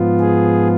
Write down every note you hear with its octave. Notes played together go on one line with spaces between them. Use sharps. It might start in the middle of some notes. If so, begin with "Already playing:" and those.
Already playing: G#2 F3 B3 F4
G#4